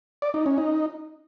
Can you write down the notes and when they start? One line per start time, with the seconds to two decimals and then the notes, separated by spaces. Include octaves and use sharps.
0.22 D5
0.34 D#4
0.46 C#4
0.58 D#4